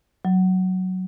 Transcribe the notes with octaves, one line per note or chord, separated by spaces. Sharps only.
F#3